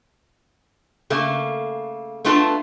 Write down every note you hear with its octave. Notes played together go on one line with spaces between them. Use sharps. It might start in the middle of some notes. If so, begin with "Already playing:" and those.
C#3 A3 A#3
A3 B3 D4 F4 A4 A5